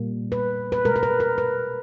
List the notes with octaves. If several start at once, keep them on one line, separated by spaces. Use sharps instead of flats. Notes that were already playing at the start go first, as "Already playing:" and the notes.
Already playing: A#2 G3 A#3
B4
B4
B2 G#3 A#4
A#4
B4
A#4
B4